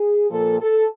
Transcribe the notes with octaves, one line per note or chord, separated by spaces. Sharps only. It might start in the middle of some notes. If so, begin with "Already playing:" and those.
Already playing: G#4
A#2 F3 A#3 A4
A4